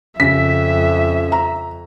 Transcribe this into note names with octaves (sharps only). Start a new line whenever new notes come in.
F2 C#3 E5 B6
A#5